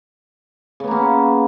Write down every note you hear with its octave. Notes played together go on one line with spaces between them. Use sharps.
C#3 A#3 B3 C#4